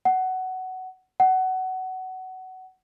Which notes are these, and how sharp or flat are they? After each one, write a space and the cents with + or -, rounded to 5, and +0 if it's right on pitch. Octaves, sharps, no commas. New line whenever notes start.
F#5 +15
F#5 +20